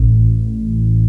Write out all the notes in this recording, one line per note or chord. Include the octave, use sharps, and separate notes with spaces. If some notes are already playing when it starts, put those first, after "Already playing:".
Already playing: A1